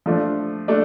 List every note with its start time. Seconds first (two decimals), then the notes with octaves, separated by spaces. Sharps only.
0.06 F3 A3 D4
0.68 A3 D4